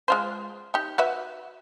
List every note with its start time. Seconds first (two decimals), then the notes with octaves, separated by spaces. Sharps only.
0.08 G#3 F4 C5
0.74 D#4 G4
0.98 F#4 B4 E5